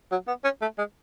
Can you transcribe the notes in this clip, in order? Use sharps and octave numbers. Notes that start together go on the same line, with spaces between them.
F#3
B3
C#4
A3
G#3